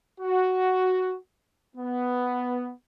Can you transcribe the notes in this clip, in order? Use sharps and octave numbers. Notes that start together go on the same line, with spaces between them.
F#4
B3